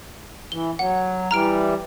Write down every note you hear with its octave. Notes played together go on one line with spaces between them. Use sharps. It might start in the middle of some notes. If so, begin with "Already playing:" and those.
E3 G7
F#3 F#5
E3 G3 A#5 F6 D7